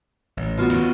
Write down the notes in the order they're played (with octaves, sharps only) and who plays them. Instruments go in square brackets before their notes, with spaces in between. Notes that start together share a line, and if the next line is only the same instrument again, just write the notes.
[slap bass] A1
[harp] B3 F4 F#4
[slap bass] D#2 D#3